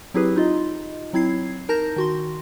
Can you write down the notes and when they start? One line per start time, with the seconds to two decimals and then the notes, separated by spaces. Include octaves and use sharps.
0.14 F#3 C4 E4 G4 G#4 B4
0.36 D#4 F4 D#5
1.13 F#3 C4 E4 G#6 C7
1.69 D#4 A#4 A5 A#5 G6 A#6
1.96 D#3 F#4 C6